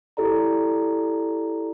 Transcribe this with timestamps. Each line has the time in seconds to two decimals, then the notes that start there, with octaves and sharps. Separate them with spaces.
0.17 E4 G4 A4 D5 A#5